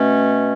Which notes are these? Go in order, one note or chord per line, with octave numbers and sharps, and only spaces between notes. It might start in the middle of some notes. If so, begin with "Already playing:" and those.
Already playing: B2 A3 C#4